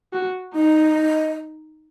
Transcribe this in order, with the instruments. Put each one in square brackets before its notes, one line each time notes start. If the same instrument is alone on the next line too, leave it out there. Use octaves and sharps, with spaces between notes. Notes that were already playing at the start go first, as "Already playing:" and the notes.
[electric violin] F#4
[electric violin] D#4 [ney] D#5